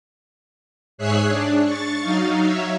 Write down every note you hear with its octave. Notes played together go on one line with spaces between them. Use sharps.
G#2 G#4 C#5 E5 F#6 C7
D4
C#6 A6
F#3 D#4 F5
F#3 C#5 E5